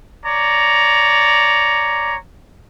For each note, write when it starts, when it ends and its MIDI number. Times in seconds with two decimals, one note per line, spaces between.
0.24 2.16 73
0.24 2.16 74
0.24 2.16 82